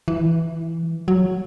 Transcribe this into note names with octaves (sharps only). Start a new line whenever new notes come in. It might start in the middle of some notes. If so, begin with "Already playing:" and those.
E3
F#3